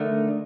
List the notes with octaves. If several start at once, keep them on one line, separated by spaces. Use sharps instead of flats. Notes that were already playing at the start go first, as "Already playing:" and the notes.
Already playing: D3 A3 D#4 A#4